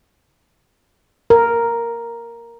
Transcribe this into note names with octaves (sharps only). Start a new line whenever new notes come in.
A#4